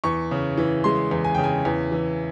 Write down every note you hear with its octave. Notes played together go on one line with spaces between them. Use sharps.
E2 C#6
C#3
E3
G#3 C6
E2
G#5
C#3 G5
G#5
E2
E3